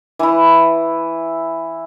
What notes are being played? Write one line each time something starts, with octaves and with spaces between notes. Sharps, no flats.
E3 E4